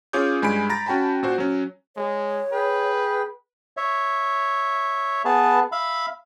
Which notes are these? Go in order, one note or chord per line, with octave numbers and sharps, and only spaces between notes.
C#4 F4 G#4 C#5 D6 G6
G2 G#3 G#5 B5 D7
A#5 B5 A6 A#6
C#4 F#4 G5 A5 B5
A#2 F#4 C5
F#3 C#4
G#3 C#5
G#4 B4 G5
C#5 E5
B3 G#4 B4 A5
E5 F5 B5